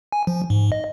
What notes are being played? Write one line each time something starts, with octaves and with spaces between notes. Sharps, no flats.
G#5
F3
G#2
D#5